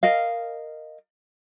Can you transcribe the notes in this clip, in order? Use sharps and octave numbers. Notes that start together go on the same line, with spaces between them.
A#4 D#5 F5